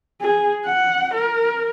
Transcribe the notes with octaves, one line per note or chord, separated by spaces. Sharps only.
G#4
F#5
A#4